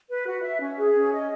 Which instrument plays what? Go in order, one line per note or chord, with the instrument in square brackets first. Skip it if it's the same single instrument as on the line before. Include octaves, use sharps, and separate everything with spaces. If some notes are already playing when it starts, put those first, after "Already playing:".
[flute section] B4
F#4
E5
C#4
G#4
C#4
D#5